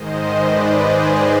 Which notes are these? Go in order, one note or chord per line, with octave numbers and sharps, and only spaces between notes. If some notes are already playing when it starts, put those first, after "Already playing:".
Already playing: G#2 D#3 G#3 C5 D#5
B4 D5
G#4 C5